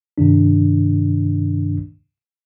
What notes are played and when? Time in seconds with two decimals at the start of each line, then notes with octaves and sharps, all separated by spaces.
0.18 G2 C3 D#3 D4